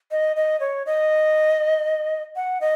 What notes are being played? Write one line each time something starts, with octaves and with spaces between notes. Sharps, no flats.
D#5
D#5
C#5
D#5
F#5
D#5